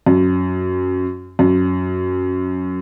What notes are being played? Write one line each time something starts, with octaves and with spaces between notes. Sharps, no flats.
F#2
F#2